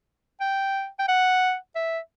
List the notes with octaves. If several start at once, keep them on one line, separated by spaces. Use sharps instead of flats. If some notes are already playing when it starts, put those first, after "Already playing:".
G5
G5
F#5
E5